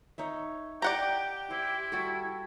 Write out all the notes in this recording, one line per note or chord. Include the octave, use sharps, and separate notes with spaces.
D#4 C#5 E5
G4 D5 F#5 G5 A#5
E4 C5
G3 F#4 A4